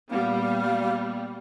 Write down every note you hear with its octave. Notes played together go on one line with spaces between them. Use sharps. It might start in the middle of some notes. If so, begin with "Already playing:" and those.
A#2 G3 B3 F5 F#5